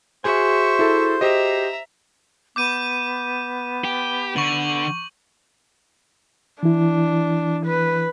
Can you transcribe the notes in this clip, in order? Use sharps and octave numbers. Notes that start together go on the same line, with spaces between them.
F#4 G#4 C5 E5 G#5 C#6
E4 A4
G4 C5 D#5 E5 A#5
B3 D6 G6 D#7
G4
D3 C#6 F#7
E3 D4 E4
B4